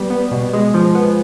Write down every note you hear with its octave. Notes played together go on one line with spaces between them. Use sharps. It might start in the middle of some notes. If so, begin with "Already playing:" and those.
Already playing: G3 B3
B3
B2
G#3
F3
B3